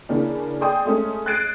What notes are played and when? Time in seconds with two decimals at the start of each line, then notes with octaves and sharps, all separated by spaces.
0.09 C#3 E3 A#3 C#4 D4
0.61 G#4 D5 G5 C6 D#6
0.85 G#3 A3 C#4
1.26 F#6 G#6 A6 C7 D7 D#7